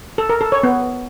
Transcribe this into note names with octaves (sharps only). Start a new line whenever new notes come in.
A4
A#4
A4
C#5
B3